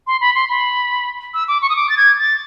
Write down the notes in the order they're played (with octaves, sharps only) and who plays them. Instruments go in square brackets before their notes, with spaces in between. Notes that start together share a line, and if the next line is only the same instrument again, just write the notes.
[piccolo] C6
B5
C6
B5
E6
D6
C#6
D#6
D6
A6
G#6
A6